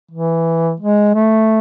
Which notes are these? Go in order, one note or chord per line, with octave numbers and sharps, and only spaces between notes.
E3
G#3
A3